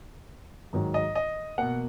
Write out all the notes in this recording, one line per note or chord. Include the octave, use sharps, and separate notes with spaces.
G#2 D#3 F#3
D#5
D#5
B2 A#3 F#5